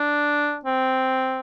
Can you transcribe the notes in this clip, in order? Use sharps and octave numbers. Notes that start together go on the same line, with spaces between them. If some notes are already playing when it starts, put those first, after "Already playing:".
Already playing: D4
C4